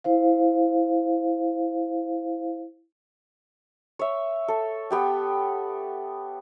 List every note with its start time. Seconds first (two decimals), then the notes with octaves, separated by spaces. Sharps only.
0.04 E4 C5 F5
3.99 C#5 E5
4.48 A4
4.91 B3 G4 G5